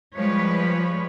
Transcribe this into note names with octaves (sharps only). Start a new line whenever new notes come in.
F3 G3 G#3 B4 C#5